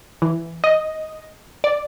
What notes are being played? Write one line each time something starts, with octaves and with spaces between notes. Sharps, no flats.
E3
D#5
D5